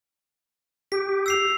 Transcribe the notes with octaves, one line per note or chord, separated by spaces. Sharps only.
G4 B6
E6 C7 F7